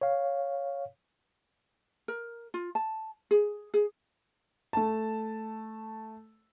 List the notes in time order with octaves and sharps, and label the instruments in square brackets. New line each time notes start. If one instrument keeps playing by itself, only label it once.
[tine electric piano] C#5 F5
[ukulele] A#4
F4
A5
G#4
G#4
[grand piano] A3 A5